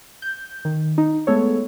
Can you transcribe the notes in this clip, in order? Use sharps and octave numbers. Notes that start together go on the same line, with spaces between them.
G6
D#3
D#4
G#3 A3 B3 A4 C#5